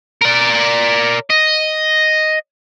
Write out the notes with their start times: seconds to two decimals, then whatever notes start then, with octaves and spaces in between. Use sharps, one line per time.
0.22 A#4 D5
1.30 D#5